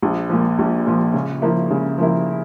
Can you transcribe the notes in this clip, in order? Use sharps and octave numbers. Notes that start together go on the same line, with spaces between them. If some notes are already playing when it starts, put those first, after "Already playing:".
A#1
A#2 F3
A#1
A#2 F3
C#3
F3 A#3 E4
C#3
F3 A#3 E4